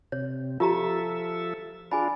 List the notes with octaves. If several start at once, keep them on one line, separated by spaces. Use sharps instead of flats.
C3 C#5
F3 F4 G4 A4 E5 A#5
D4 F4 G#4 G#5 B5